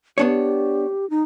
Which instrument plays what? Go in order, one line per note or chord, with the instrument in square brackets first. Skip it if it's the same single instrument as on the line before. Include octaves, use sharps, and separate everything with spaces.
[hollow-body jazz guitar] B3 D4 C#5 [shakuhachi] G4
[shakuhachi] D#4